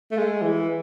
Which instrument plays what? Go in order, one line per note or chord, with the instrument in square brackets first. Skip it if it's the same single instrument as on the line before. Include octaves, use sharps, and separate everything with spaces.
[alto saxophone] A3
G#3
E3